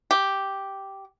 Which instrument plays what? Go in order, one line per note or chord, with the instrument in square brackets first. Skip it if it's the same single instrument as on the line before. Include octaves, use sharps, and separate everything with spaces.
[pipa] G4